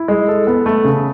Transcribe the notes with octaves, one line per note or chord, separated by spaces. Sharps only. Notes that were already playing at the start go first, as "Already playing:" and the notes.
Already playing: E4
G#3
A4
B3
A3
C#3